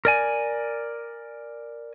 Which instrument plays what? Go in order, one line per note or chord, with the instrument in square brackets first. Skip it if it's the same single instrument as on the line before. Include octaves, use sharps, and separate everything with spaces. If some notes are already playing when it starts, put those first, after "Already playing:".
[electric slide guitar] A#4 D5 G#5